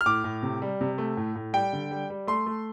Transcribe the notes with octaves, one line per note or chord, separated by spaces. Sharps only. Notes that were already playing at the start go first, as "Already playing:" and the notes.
F6
A2 D6
A2
C3
G3
C3
A3
A2
A2
G3 G5
D3
G3
G3
A3 C6
A3